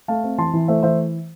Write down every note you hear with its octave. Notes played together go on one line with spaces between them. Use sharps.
A3 F5 A5
C4
E3 A5 C6
E3
A3 C5 E5
E3 C5 E5